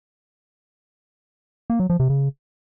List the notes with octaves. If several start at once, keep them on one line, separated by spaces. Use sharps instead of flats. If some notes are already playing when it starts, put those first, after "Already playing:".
A#3
F#3
F3
C3
C#3